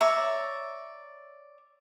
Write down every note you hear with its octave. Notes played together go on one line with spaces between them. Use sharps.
C#5 D5 E5 A#5